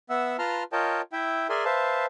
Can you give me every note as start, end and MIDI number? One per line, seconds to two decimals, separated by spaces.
0.10 0.37 59
0.10 0.37 76
0.10 0.37 78
0.10 0.37 88
0.39 0.63 65
0.39 0.63 71
0.39 0.63 81
0.39 0.63 82
0.39 0.63 84
0.39 0.63 89
0.72 1.01 65
0.72 1.01 70
0.72 1.01 73
0.72 1.01 75
0.72 1.01 79
0.72 1.01 81
1.13 1.47 64
1.13 1.47 76
1.13 1.47 79
1.49 1.65 68
1.49 1.65 70
1.49 1.65 74
1.49 1.65 76
1.49 1.65 80
1.49 1.65 84
1.65 2.06 71
1.65 2.06 72
1.65 2.06 76
1.65 2.06 77
1.65 2.06 81